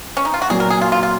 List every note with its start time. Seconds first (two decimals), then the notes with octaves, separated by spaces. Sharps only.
0.17 C#4
0.25 D#4
0.34 F4
0.42 F#4
0.50 A#2 F#3 C4 G#4
0.60 A#4
0.70 G#4
0.81 F4
0.92 F4
1.03 F4